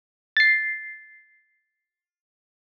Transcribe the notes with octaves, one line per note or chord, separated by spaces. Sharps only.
A6 C7